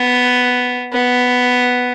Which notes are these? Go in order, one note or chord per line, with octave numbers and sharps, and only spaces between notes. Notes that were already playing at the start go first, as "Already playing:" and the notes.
Already playing: B3
B3